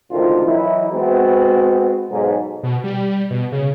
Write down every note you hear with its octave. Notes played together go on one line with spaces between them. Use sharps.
D2 G#2 C3 D#3 F4 C5
E3 F#3 D#4 E4
G#3 B3 C4 F#4
B1 G#2
B2
G3
B2
C#3